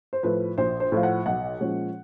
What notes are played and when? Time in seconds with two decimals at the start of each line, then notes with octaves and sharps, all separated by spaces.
0.13 C5
0.23 A2 F3 B4
0.58 A#1 C5
0.80 C5
0.92 A2 F3 F5
1.03 F#5
1.26 B1 F#5
1.61 A#2 F3 G#3 C#4